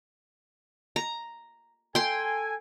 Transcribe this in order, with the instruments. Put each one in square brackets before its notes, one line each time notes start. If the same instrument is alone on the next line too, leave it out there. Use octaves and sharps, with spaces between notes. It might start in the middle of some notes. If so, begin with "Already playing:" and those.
[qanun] A#5
[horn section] A4 G#5 [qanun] G5 C6